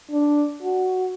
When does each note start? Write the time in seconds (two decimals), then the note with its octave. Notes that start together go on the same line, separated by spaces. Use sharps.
0.12 D4
0.62 F#4